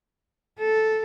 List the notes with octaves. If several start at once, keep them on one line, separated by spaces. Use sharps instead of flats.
A4